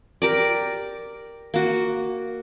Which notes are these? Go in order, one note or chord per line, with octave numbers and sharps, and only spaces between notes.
G4 A#4 D5
A#3 F#4